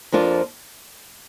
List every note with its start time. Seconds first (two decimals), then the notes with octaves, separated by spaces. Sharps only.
0.12 F2 F3 A#3 D4 F4